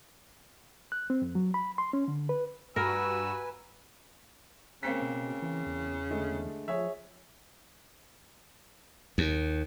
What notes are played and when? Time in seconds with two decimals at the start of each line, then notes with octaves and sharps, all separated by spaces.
0.92 F#6
1.10 C4
1.22 F2
1.35 F#3
1.54 B5
1.78 C6
1.93 C#4
2.08 D3
2.29 B4
2.76 G2 F#4 A#4 B4 G#5 E6
4.83 C#3 A#3 C4 B6
5.02 B2
5.42 E3
5.66 E2
6.10 D3 G#3 A3
6.68 F3 G#4 C#5 E5
9.18 D#2